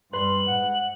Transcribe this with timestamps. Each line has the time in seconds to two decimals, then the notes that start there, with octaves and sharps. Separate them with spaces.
0.13 G2 G3 B4 C6 F#7
0.47 G#2 F#5